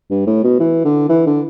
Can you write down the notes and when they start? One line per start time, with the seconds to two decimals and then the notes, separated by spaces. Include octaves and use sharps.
0.10 G2
0.27 A2
0.44 B2
0.60 E3
0.85 D3
1.09 E3
1.27 D3